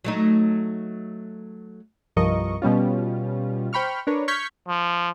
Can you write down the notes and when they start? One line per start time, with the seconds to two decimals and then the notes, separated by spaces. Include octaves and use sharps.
0.04 F#3 A3 D#4
2.16 C2 G2 F3 A#4 D#5 C#6
2.62 B2 G3 C#4 F4
3.73 C5 G5 B5 C#6 F6
4.07 D4 A#4 B4 C#5
4.28 C#6 F6 G6 G#6 B6 C#7
4.68 F3